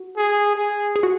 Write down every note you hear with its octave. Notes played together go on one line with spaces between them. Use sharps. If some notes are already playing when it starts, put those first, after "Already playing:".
Already playing: F#4
G#4
G#4
G#4
F#4